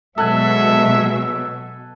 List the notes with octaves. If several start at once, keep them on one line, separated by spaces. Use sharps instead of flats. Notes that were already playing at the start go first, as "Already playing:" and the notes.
B2 F#3 G#3 A4 E5 F#5 G#5